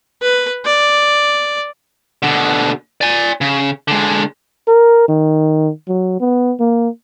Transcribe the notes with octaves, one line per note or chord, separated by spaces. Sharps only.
B4
D5
B2 D3
D5 G#5
C#3
D3 G#3
A#4
D#3
F#3
B3
A#3